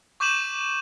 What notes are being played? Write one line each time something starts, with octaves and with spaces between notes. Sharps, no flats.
C#6 D6 G6 D#7 E7 F#7